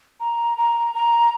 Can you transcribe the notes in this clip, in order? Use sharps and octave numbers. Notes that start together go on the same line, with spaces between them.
A#5
A#5
A#5